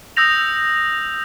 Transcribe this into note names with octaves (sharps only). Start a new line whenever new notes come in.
D#6 E6 G6 A#6 F7